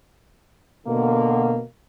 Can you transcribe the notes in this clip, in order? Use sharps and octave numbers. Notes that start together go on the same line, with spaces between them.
B2 D3 A#3